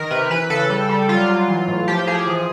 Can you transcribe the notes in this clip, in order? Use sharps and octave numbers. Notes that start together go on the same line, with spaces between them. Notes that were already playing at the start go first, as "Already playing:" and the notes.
Already playing: D#3 A#4
C3 B4
E3 B4
C#3 A4
G3
G3
F#3 F4
F#3
E3
A2
F3 G4
F3 G#4
E3